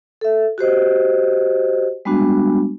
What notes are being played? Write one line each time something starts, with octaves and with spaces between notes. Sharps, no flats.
A4 E5
F#4 G4 C5 D#5
G3 G#3 B3 D4 F#4